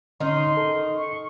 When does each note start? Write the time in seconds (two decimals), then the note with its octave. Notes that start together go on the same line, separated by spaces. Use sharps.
0.20 D3 D#3 C#4 D#4 C6
0.57 A4
0.96 C#6